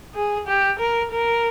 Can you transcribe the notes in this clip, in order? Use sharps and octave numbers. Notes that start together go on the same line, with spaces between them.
G#4
G4
A#4
A#4